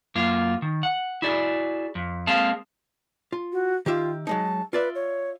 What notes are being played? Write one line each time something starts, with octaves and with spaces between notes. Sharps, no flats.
F#2 A#3 F4
D#3
F#5
E4 F#4 G#4 D5
F2
G#3 A#3 C4 F5 A5
F4
F#4
D#3 F4 G4 E5
F#3 G#3 D#4 A5
F4 B4 D5 E5
C#5